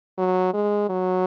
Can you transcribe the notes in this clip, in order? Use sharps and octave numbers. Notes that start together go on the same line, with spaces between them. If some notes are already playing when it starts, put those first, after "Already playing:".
F#3
G#3
F#3